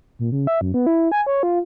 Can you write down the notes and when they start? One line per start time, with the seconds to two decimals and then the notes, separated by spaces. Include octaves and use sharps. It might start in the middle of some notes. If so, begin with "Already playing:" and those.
0.19 A#2
0.32 C#3
0.47 E5
0.61 F#2
0.74 B3
0.86 E4
1.12 G#5
1.26 C#5
1.43 F4